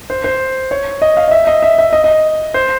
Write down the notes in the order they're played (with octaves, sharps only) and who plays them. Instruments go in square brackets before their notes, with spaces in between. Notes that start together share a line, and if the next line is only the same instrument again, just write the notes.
[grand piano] C5
C5
C#5
D#5
F5
D#5
E5
D#5
E5
E5
D#5
D#5
C5